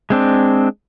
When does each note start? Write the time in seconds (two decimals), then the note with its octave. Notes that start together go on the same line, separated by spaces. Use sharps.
0.10 G#3 C4 D4